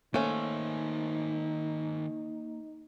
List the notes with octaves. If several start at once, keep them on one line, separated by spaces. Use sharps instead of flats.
D#3 A3 A#3 C#4 D#4 C5